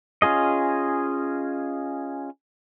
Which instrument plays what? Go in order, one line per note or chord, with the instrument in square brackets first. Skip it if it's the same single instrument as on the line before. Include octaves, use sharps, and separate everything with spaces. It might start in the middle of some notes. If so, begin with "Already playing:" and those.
[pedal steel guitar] C#4 F4 G#4 D#5